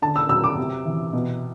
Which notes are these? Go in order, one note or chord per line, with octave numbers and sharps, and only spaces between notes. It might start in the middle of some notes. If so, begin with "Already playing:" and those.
D3 A5
E6
F#3 E6
D6
C3
E3
B2